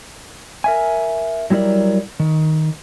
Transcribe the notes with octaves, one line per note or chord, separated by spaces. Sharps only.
A#4 E5 G#5
F#3 G3 E4 A#4 D5
D#3